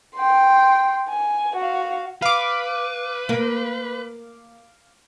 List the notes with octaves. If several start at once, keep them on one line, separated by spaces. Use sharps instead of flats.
G5 C6
G#5
F#4 F5
B4 F5 D6
A#3